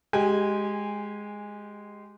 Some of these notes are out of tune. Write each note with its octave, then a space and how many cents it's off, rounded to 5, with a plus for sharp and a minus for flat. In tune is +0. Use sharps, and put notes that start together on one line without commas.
G#3 +0 G4 -20 G#5 -20